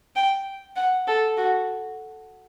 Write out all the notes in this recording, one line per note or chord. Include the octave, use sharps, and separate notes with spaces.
G5
F#5
A4
F#4